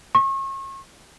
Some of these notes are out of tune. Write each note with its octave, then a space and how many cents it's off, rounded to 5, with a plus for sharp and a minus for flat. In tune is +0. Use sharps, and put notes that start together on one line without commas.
C#6 -35